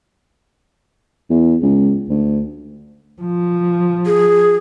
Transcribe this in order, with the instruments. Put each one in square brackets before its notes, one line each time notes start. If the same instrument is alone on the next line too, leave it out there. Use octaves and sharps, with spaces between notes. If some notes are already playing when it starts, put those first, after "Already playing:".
[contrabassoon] E2
C#2
D2
[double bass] F3
[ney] G#4